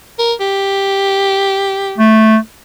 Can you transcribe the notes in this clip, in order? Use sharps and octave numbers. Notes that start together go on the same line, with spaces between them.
A#4
G4
A3